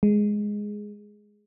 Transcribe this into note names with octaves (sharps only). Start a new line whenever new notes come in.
G#3